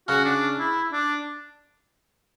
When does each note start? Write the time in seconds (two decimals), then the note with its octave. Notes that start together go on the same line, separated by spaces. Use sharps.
0.08 C#3 C#4 F#4
0.25 D4
0.59 E4
0.93 D4